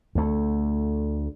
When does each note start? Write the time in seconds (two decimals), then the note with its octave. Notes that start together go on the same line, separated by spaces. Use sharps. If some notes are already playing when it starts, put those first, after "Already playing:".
0.15 D2 A3